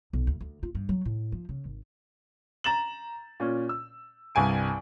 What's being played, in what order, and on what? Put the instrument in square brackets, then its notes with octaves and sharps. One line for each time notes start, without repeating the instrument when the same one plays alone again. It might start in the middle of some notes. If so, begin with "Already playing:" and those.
[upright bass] B1
D2
D2
F4
G2
F#3
A2
F3
C#3
G#1
[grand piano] A#5 A6 E7 F#7
A#2 C#4
E6
C2 G2 G#5 D7